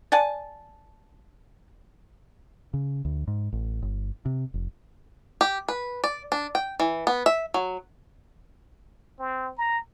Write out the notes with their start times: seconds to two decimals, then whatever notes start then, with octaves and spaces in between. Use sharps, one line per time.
0.12 D5 F#5 G#5 A5
2.74 C#3
3.05 D2
3.28 G#2
3.52 A1
3.82 G1
4.26 C3
4.54 F1
5.41 G4
5.68 B4
6.04 D5
6.32 D4
6.55 G5
6.80 E3
7.07 B3
7.26 E5
7.54 F#3
9.19 C4
9.58 A#5